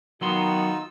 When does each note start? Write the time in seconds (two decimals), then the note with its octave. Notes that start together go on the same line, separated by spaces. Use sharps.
0.21 D#3 F#3 B3 D#4 F4 F#4 C6 E6